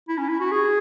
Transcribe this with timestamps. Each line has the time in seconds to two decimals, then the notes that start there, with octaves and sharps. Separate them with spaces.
0.09 E4
0.18 C#4
0.29 E4
0.40 F#4
0.51 G#4